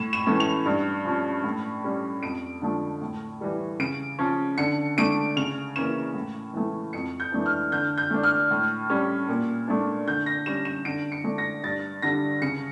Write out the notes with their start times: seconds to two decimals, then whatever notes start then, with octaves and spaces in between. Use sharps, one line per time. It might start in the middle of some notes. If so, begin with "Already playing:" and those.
Already playing: A2 E7
0.13 E7
0.26 E3 A3 C#4
0.40 F7
0.65 G2
1.05 F3 C#4
1.44 A2
1.84 G3 C#4
2.23 F2 D7
2.61 D3 F3 A3
3.02 A2
3.41 E3 G3
3.80 C#3 D7
4.19 F3 C#4
4.58 D3 C#7
4.97 A3 D4 D7
5.36 C#3 F7
5.76 E3 A#3 C#4 E7
6.14 A2
6.53 E3 A3
6.93 F2 C#7
7.20 G6
7.32 E3 A3 D4
7.46 F6
7.72 D3 G6
7.98 G6
8.11 A3 D4
8.23 F6
8.51 A2
8.90 G3 C#4
9.28 A#2
9.68 A3 D4
10.07 D3 G6
10.26 A#6
10.46 G3 C#4 E7
10.65 E7
10.85 D3 D7
11.12 C#7
11.24 A3 D4
11.38 A#6
11.64 G2 A6
12.02 D3 G3 A#6
12.42 C#3 C#7